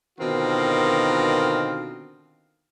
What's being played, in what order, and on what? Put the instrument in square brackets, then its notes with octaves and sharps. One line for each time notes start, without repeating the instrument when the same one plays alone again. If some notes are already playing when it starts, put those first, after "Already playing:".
[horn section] B2 D3 D#3 C4 F4 A#4